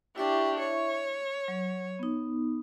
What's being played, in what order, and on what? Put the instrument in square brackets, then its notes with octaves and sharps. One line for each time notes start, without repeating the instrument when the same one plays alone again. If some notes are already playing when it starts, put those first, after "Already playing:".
[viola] D4 G4 [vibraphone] E4 E5 C#6
[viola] C#5
[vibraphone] F#3
B3 D#4